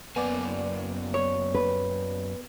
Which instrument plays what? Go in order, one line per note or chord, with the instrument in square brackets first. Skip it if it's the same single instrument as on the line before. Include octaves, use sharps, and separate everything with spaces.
[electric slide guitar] F#2 A#3 G#5 [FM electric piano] B3 D5
[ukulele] C#5
[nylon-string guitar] B4